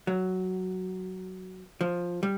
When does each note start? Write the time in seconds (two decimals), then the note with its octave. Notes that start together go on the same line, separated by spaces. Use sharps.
0.07 F#3
1.81 F3
2.23 G3